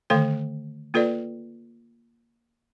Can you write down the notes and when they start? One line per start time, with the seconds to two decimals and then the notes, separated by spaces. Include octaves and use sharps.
0.10 D3 D#3 A3 A4 F5
0.94 A#3 F4 A4 B4 D5